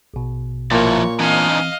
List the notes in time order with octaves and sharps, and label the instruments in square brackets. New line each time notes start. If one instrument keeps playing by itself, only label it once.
[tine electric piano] A#1 B2
[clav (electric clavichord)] A#2 A#3 [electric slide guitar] F3 E4 A5 [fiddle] C#5
[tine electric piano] E3 C4 C#7 [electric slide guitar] D4 D#4 G#5 [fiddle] D#5 F5